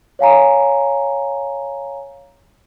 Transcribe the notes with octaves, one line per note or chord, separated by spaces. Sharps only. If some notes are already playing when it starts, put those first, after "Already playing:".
C#5 F5 G#5 A#5